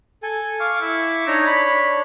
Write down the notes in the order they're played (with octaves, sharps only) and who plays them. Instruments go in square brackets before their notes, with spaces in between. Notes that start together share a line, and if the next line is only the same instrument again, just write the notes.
[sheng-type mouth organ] A4 G#5
[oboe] F5 [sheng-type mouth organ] C#6 D6
[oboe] E4
[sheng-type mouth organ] D4 C#5 [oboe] D#4
[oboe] B5